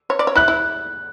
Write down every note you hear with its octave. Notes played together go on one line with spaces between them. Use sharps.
C#5
D5
C#5
E4 F#6
E4